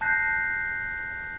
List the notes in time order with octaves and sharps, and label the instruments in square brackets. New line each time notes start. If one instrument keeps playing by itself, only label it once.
[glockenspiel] A5 F#6 G6 A#6 C7